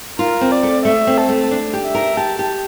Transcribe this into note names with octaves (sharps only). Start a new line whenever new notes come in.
F4 A#4
C4
D5
A3
A3 E5
C4
A4
A3
D4
G4
E5
A#4
G4 A5
G4